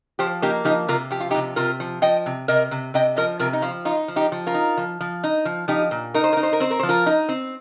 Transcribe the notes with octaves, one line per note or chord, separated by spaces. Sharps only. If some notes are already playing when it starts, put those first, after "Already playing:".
F3 G4 C5
A#3 D#4 G4
F3 D#4 G4
C3 F4 A#4
F3 G4
F4
D#4 G4
C3
C3 F4 A#4
F3
F3 D#5 G5
C3
C3 A#4 D#5
C3
C3 D#5 G5
F3 A#4 D#5
C3 F4 A#4
D#4
F3 F4
D#4 F4
F3
D#4 G4
F3
F4 A#4
D#4
F3
F3
D#4
F3
F3 D#4 G4
A#2
D#4 A#4
C5
D#4 A#4
C5
A#4
C4 C5
A#4
F3 C5
F4 A#4
D#4
C4